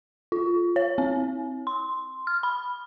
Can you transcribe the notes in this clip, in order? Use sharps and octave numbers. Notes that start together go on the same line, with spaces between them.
F4
C#5
C4
C6
F6
B5